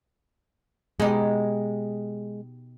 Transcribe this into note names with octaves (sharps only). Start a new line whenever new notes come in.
B2 G#3 D#4 G4